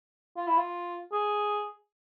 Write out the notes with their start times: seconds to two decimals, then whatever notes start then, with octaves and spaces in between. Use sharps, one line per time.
0.37 F4
0.47 E4
0.57 F4
1.13 G#4